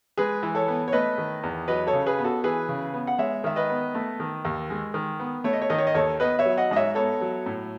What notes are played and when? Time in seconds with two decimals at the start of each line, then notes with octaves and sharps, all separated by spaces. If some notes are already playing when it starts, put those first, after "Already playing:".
0.17 G#3 G#4 B4
0.43 E3
0.55 A4 C#5
0.68 B3
0.88 C#5
0.92 A3 B4 D#5
1.18 D#3
1.43 E2
1.68 F#3 B4 D#5
1.87 A4 C#5
1.93 C#3
2.06 G#4 B4
2.18 B3
2.24 F#4 A4
2.44 E3 G#4 B4
2.68 C#3
2.93 B3
3.07 F#5
3.18 G#3 C#5 E5
3.44 D#3 E5
3.56 B4 D#5
3.70 B3
3.95 A3
4.20 D#3
4.45 D#2
4.70 G#3
4.94 D#3
5.20 B3
5.44 A3 C#5
5.53 D#5
5.62 C#5
5.70 D#3 D#5
5.78 C#5
5.87 D#5
5.95 D#2 A4 C#5
6.20 B3 B4 D#5
6.39 C#5 E5
6.45 F#3
6.57 D#5 F#5
6.71 G#2 D#5
6.76 C#5 E5
6.95 B3 A4 C#5
7.21 F#3
7.46 A2